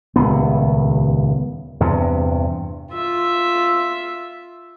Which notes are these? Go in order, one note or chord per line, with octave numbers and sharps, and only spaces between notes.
D#1 C#2 B3
E2 G2 C3
F4 E5